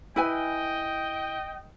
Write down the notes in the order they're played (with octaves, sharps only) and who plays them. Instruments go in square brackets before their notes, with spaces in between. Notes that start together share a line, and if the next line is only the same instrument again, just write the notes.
[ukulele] E4 B4 G#5 [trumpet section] D#5 G5